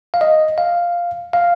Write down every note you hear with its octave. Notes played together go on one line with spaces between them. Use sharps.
F5
D#5
F5
F5